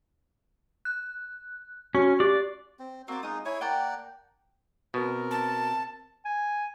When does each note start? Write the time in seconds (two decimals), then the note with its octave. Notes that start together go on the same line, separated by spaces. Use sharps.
0.85 F#6
1.95 C#4 F#4 C#6
2.20 G4 D5
2.79 C4
3.08 A#3 C4 F#4 D5
3.23 G#3 D#4 F4 D#6
3.45 E4 G#4 C#5
3.61 A#3 D5 F#5 G5 A5 A#5
4.94 B2 C4 A#4
5.31 A5
6.25 G#5